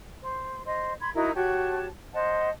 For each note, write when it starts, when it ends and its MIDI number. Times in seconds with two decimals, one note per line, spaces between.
0.21 0.61 72
0.65 0.92 72
0.65 0.92 75
0.99 1.09 83
0.99 1.09 84
0.99 1.09 92
1.14 1.30 63
1.14 1.30 64
1.14 1.30 66
1.14 1.30 70
1.34 1.85 66
1.34 1.85 67
1.34 1.85 73
1.34 1.85 81
2.13 2.49 72
2.13 2.49 75
2.13 2.49 78
2.13 2.49 81